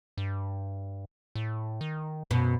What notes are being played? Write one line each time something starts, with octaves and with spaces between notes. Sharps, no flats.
G2
A2
D#3
F#2 B2